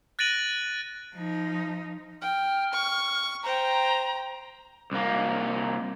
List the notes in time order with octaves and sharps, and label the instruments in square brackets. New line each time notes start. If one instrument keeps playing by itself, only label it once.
[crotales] F#6 A6 A#6 D7 D#7 F#7
[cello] F3 D#4
[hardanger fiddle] G5 [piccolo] F6
[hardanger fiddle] C#6
[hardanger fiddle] C5 G5 [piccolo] A#5
[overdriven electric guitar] C2 A#3